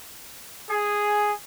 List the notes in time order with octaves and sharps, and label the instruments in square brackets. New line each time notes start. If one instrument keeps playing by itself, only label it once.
[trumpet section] G#4